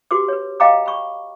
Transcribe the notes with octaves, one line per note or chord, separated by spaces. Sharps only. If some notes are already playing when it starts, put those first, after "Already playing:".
F#4 G4 B4 C6 D6
B4 C#5
D#5 F5 G5 A#5 D6
B5 C#6